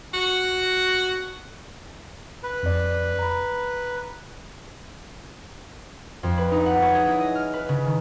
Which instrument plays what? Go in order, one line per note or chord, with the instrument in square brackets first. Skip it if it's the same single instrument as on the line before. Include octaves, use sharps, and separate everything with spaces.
[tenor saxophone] F#4
[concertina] B4
[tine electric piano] F2 D5
A#5 B5
[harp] F2
B4
D#4
F#5
C#5
G#4
E4
D#5
F6
B4
C#3
D#3